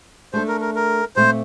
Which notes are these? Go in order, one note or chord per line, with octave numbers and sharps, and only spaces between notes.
A3 D4 A4 C5
A#4
A#4
A#4
A#2 A3 C4 C5